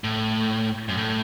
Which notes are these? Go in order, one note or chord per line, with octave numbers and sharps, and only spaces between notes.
A2
F#2
A2